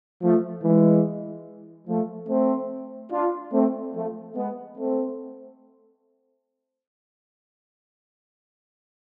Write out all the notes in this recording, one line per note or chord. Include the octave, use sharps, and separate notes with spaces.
F3 A3
E3 G#3
F3 A3
A3 C4
D4 F4
A3 C4
F3 A3
G#3 B3
A3 C4